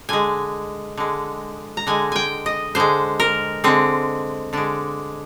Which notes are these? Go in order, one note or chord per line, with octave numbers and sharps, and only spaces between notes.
D3 G#3 G#5
D3 G#3
A#5
D3 G#3 G#5
G5 G#5
D#5
D3 G#3 C5
A#4
D3 G#3 C4
D3 G#3 D4